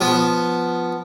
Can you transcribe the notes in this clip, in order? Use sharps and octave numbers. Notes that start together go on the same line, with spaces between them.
F3 B3